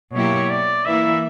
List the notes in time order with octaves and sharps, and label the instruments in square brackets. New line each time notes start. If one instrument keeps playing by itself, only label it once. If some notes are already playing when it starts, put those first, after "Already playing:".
[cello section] B2 F#3 A#3 E4 G4 [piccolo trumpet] C#5
[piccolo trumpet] D5
[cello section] E3 A#3 E4 [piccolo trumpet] E5